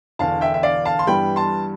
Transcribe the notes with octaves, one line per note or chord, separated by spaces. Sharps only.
E1 E2 D3 F5 A5
E5 G5
E5
D5 F5
F5 A5
C6
G2 E3 G3 B3 G5 B5
A5 C6